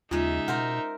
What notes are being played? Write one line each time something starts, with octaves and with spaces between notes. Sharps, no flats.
D#2 C#3 G#3 D#4 F4 E5
B2 A#4 C5 F#5 A#5